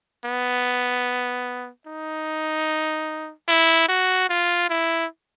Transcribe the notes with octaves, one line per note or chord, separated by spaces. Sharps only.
B3
D#4
E4
F#4
F4
E4